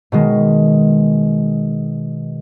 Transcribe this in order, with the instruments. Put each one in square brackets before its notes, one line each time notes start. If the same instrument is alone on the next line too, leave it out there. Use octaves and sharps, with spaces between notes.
[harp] B2 D#3 G#3